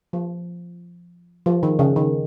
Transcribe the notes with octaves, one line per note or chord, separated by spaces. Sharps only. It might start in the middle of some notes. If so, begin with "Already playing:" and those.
F3
F3
D#3
C#3
D#3